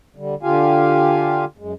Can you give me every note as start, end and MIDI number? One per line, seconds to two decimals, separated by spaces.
0.16 0.35 50
0.16 0.35 55
0.43 1.45 50
0.43 1.45 65
0.43 1.45 67
0.43 1.45 77
0.43 1.45 80
1.58 1.74 42
1.58 1.74 56